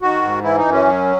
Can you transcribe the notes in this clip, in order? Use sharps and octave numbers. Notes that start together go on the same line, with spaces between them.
D#3 F#4
G#2
E3 E4
D#4
F#2
C#4
F#3